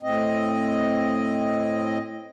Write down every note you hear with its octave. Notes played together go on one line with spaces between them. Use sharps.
A2 C4 D#5